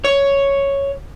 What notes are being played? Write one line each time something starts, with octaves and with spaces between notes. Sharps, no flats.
C#5